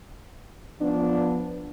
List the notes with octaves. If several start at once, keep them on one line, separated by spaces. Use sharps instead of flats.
F3 B3 D4